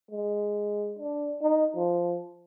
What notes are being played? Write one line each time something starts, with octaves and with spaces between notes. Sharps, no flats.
G#3
D4
D#4
F3